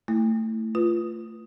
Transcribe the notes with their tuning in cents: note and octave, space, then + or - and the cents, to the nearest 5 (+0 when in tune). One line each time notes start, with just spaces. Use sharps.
A3 +20 E4 +0
F4 -20 B4 -10